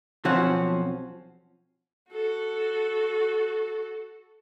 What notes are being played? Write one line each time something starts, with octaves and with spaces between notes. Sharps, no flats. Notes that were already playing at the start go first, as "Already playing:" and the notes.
B1 F3 C4 C#4 F#5
F#4 A4